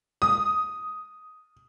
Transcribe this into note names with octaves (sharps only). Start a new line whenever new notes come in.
D#6